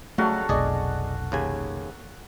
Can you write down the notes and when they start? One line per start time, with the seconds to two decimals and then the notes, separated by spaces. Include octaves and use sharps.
0.18 C#3 F#3 G3 A3 F#4 A4 F5
0.49 F1 B1 G#4 D5 D#5
1.32 D#2 C#3 G#5